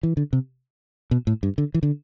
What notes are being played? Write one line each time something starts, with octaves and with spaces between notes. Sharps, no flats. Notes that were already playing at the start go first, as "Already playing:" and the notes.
E3
D3
C3
B2
A2
G2
D3
E3
D3